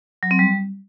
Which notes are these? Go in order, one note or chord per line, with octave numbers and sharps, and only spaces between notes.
F#3
C4
G3